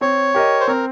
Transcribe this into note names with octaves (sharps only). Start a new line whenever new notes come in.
C4 C#5
G4 A#4 D#5
C5
C4 A#4